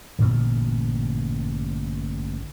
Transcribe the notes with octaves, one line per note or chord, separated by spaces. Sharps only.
A1 G2 A#2 D3